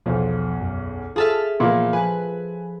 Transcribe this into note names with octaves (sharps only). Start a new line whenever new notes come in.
B1 E2 B2 F3
F#2
F4 G#4 A4 E5 A5 F6
A#2 E3 F3 A#3 B3 E4
F3 B4 G#5